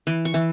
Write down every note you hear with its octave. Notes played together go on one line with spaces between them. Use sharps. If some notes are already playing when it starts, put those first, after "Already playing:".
E3
C#6
E3